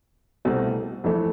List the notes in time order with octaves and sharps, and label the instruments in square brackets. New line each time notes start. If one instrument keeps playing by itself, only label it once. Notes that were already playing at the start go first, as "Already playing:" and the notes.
[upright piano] C2 B2 A3 C4
F2 E3 A3